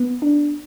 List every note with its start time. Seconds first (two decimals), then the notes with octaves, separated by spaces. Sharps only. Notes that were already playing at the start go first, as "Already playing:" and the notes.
Already playing: B3
0.22 D4